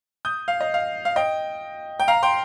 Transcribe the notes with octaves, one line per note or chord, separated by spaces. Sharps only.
D#6 G6
F5
D#5
F5
F5
D#5 G5
G5
F5 A#5
G5 C6